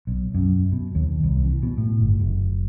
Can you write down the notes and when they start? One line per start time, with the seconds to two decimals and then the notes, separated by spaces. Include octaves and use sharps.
0.07 B1
0.34 F#2
0.72 B2
0.95 D#2
1.23 C2
1.45 E3
1.63 B2
1.77 A2
2.01 G1
2.20 F#1